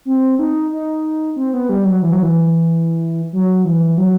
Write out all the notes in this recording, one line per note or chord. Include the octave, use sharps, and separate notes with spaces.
C4
D#4
D#4
C4
B3
G3
F#3
E3
F#3
E3
F#3
E3
F#3